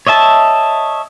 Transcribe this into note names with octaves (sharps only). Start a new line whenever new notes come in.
C#5 D#5 E5 A5